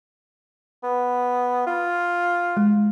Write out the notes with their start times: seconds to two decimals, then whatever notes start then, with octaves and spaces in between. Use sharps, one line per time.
0.83 B3
1.66 F4
2.57 G#3